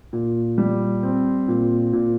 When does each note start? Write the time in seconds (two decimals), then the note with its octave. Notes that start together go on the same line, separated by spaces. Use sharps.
0.13 A#2
0.58 G3
1.03 C4
1.48 A#2
1.93 A#2